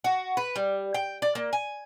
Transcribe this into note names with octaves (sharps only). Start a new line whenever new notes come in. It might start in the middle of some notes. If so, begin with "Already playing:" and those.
F#4
B4
G3
G5
D5
A#3
G#5